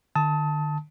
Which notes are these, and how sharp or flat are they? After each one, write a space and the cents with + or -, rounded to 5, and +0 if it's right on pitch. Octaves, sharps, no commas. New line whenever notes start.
D3 +45 A5 +0 D#6 +35